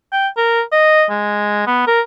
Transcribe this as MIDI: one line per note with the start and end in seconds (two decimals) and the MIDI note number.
0.12 0.28 79
0.37 0.61 70
0.72 1.05 75
1.11 1.62 56
1.67 1.87 59
1.87 2.00 70